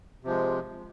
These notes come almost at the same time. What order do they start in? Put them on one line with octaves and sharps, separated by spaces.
C3 F3 G#3